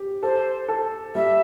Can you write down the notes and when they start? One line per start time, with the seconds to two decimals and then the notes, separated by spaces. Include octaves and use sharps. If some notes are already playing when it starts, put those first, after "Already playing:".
Already playing: G4
0.23 A4 C5
0.68 A4
1.15 G3 E5